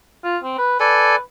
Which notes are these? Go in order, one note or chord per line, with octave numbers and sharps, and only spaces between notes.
F4
C4
B4
A4 B4 D5 G#5